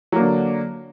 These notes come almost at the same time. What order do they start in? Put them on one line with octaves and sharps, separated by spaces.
F#3 A#3 D4 D3